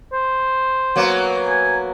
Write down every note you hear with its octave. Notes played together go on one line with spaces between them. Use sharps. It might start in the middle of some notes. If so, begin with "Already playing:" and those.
C5
F#3 A#3 B3
G#5